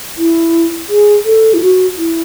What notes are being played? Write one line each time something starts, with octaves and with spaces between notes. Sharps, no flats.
E4
G#4
A4
E4
F#4
E4